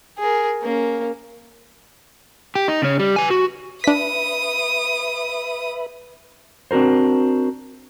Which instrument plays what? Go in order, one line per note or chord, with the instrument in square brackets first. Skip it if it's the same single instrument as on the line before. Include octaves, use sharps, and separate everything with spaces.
[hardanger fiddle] G#4 A#4
A#3 C#4
[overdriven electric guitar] G4
D#4
C#3 C#4
G3
B4 G#5
F#4
[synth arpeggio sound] D4 B6 [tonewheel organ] B4 E5 B5 [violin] D#6
[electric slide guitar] C4 D4 F#4 A#4 C5